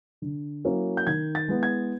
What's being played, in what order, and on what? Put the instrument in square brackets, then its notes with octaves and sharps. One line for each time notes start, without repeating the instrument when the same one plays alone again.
[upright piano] D3
F#3 A#3 C#4 E4
G6
D#3 G#6
A6
G#3 B3 E4
G#6